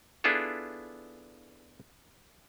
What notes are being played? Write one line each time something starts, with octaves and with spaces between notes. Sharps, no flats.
B3 D4 E4 F4 G#4 A4